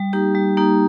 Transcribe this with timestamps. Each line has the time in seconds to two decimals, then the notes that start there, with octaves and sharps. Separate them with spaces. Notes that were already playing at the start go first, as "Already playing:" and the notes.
Already playing: G3
0.13 A#3 D#4 G4
0.35 G3
0.57 A#3 D#4 G4